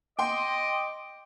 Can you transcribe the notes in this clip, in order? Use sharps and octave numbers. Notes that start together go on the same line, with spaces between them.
D#5 G5 C6 D6